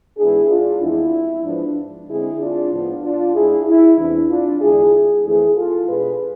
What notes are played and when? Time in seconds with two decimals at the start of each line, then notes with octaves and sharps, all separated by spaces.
0.18 G#2 E3 B3 D4 E4 G#4
0.49 D4 F4
0.81 F2 E3 G#3 B3 D4 E4
1.45 G#2 F3 B3 D4
2.08 D3 G#3 C4 E4 G#4
2.39 D4 F4
2.71 A2 F3 B3 D4
3.03 D4 F4
3.34 G#2 G#3 D4 E4 G#4
3.66 E4
3.98 E2 C3 E3 D4
4.29 D4 F4
4.61 E2 D3 G#3 D4 E4 G#4
5.24 F2 E3 A3 C4 E4 G#4
5.55 F4 A4
5.87 B2 G#3 D4 G#4 B4